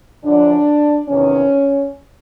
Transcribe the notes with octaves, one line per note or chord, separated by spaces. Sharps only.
F#2 D3 F3 D4
E2 C3 D#3 C#4